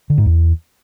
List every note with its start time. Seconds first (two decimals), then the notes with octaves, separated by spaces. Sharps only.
0.10 D3
0.18 G#2
0.26 E2